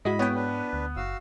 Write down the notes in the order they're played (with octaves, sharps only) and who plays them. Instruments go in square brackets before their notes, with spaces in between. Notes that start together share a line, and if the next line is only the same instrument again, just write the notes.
[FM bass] G#2 [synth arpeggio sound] G#3 E4 F#4 [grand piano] D#5 [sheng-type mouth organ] B5
[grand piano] B3 [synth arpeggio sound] C#5 G5
[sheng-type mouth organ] D4 B4
[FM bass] D2
[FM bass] F#1 [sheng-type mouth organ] F#4 F5 E6